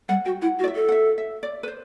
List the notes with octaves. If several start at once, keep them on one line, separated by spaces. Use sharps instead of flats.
G3 F#5
F#4 G5
E4 F#5
F#4
D5
E5
A4
F#5
E5
E5
D5
B4
C5